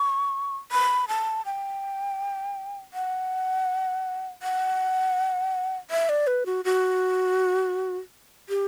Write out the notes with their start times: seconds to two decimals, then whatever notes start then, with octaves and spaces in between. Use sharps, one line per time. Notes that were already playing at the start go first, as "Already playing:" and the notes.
Already playing: C#6
0.72 B5
1.08 A5
1.46 G5
2.94 F#5
4.43 F#5
5.91 E5
6.09 D5
6.27 B4
6.46 F#4
6.65 F#4
8.49 G4